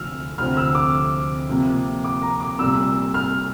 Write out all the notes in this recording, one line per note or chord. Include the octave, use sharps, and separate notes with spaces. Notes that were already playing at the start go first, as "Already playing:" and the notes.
Already playing: D2 C3 F3 E6 F6
D2 C3 F3 C4 F6
E6
D6
C3 F3 A#3
D6
A#5
D6
C2 A#2 G3 E6
F6